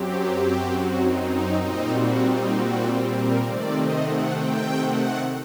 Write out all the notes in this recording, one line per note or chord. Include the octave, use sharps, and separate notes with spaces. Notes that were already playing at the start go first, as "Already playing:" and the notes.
Already playing: F#2 F#3 C4 G4
F#4
D#4
D#4
A#2 G3 C4 D#4
F#4
D#4
F#4
A#4
C3 D#3 A3 C4 D5
D#5
F#5
G5
F#5